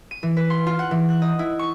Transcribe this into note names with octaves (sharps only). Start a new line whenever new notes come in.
D#7
E3
B4
C6
F4
F#5
E3
F#6
D#5
E4
C#6